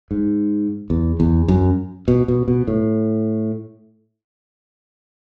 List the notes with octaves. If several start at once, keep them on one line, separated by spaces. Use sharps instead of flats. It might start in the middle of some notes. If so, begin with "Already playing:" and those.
G#2
E2
E2
F#2
B2
B2
B2
A2